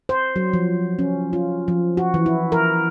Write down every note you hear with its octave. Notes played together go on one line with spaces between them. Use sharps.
C5
F#3
F3
C#4
F4
F3
F#4
E3
E4
A#4